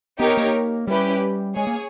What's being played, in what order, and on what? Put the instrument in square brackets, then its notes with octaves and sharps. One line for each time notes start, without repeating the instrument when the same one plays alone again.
[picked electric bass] B3 [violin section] D#4 G4 A#4 C#5
[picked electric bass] A#3
[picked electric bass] G3 [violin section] C#4 E4 G4 B4
[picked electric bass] G#3 [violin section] G#4 C#5 G#5
[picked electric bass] A#3